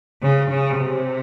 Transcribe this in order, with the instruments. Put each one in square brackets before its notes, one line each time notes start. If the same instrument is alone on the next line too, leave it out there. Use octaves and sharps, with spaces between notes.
[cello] C#3
C#3
C3